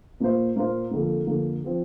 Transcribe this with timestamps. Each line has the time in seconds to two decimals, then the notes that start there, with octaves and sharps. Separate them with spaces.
0.20 A#2 A#3 F4 C5
0.56 A#2 A#3 F4 C5
0.91 F2 D3 A#3
1.27 F2 D3 A#3
1.64 F3 C4